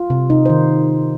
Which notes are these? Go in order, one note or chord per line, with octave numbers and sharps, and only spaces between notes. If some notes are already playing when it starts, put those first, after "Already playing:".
Already playing: F4
C3
C3 D#4
D#3 C5